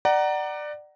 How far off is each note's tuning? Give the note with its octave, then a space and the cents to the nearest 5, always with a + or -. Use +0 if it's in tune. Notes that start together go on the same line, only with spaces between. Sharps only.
D5 +20 F#5 +25 A#5 +5